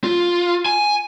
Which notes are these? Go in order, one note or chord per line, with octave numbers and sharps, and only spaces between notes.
F4
G#5